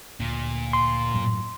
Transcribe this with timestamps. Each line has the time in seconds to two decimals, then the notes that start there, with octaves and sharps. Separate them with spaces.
0.20 D2 A#2
0.73 C6
1.14 F#2 A2 F#3